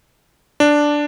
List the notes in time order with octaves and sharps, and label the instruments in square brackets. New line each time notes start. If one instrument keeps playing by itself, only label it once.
[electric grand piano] D4